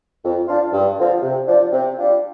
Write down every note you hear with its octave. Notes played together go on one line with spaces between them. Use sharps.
F2
F3 D4 F4
G2
D3 F3 C4 F4
C3
F3 D4
C3
G3 D4 F4